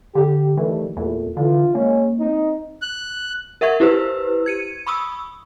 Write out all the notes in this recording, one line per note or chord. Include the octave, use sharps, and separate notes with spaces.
D3 G4
D#3 E3 G3 A3
E2 A#2 A3
D3 E3 F4
G#3 A#3 C#4
C4 D#4
F#6
A#4 E5 F#5 C#6 G#6
E4 G4 B4 C5 E6
G#6 C#7 D#7
B5 C#6 D#6 E6